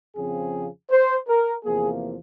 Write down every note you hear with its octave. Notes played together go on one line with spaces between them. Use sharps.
F2 C#3 F3 C4 G#4
C5
A#4
E2 C3 F3 A#3 G#4